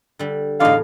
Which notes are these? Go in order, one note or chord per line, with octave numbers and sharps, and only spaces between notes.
D3 G3
E2 A2 D3 D#4 F5